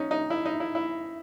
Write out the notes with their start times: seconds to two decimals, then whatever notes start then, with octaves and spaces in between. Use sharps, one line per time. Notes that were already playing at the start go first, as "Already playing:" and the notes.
Already playing: C#4 D#4
0.11 D#4
0.30 E4
0.45 D#4
0.60 E4
0.75 E4